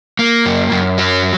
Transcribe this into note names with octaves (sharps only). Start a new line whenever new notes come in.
A#3
F#2
F#2
F#3